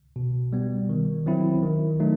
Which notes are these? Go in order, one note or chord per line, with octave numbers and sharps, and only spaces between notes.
B2
G3 B3
D#3
F#3 C4 E4
D#3
F#3 A3 D#4